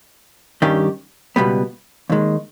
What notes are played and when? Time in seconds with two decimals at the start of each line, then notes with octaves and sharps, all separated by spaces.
0.62 G2 D#3 G3 C#4 G4
1.36 C#2 B2 G3 B3
2.10 D#2 D#3 G#3